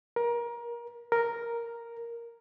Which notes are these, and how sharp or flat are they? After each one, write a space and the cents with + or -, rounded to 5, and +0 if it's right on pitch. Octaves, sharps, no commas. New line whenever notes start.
A#4 +25
A#4 +0